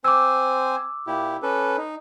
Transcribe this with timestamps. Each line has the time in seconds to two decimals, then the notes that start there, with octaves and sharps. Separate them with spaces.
0.04 C4 C5 G#5 D6 E6
1.07 A#2 E4 G4
1.43 C#4 A4 B4
1.77 D#4